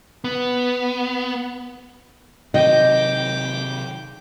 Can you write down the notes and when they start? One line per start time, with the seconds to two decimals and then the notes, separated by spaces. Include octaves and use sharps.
0.24 B3
2.54 C3 D#3 F#3 D#5 G5 D6